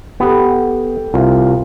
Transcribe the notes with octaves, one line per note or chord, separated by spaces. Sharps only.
B3 G4 A4
C2 F4